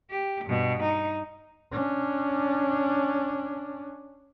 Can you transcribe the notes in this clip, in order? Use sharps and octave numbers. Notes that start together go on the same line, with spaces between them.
G4
G2 B2
D#4
C#4 D4